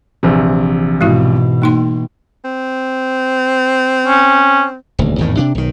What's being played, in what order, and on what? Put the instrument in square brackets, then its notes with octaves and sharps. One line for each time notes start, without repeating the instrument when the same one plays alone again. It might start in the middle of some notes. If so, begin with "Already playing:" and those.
[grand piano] A#1 C3 [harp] E3
[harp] G#2 [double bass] B2 [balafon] G#3 E4 F#4
[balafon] A#3 D#4 C6 [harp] G5
[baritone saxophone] C4
[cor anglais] C#4
[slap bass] D#1 D2
G#1 E2 A2 D#3
C3 D4
B1 D#3